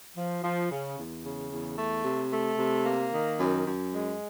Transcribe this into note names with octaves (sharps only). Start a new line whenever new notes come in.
F3
F3
C#3
E2
C#3
E2
A3
C3
A3
C3
A#3
D#3
F#2
F#2
G#3